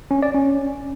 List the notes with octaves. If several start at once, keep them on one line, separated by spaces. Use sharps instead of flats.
C#4
D5
C#4